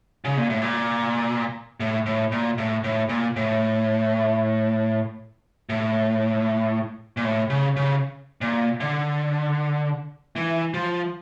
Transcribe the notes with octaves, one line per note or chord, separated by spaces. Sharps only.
C#3
A#2
A2
A#2
A2
A2
A#2
A2
A2
A#2
A2
A2
A#2
A2
C#3
C#3
A#2
D3
E3
F3